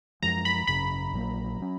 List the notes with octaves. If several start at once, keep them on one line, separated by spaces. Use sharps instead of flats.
F#2 F3 G#3 A#5
B5
G#1 F#2 C#3 B5
A#1 A#2 F#3 A#3
A#2 F#3 C#4